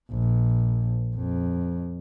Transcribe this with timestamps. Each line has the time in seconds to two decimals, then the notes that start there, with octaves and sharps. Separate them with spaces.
0.11 A#1
1.15 F2